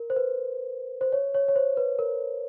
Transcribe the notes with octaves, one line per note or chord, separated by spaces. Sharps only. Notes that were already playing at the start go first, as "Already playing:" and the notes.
Already playing: A#4
C5
B4
C5
C#5
C#5
C#5
C5
B4
A#4